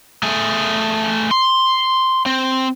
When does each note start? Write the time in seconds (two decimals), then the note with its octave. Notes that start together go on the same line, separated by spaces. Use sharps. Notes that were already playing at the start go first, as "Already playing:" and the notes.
0.23 A3 G#4
1.31 C6
2.26 C4